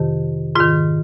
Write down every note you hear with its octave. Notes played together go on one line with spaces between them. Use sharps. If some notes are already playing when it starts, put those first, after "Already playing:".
Already playing: F2 C3 D#3 G4
G#2 D#3 F4